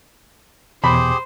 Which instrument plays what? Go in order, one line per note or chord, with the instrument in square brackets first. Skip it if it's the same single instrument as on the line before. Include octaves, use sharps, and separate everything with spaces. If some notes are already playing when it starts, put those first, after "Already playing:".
[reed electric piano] E2 B2 [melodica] G4 G#4 [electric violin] C5 [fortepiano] B5